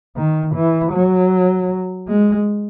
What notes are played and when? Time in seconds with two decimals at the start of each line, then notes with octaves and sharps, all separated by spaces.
0.16 D#3
0.55 E3
0.93 F#3
2.08 G#3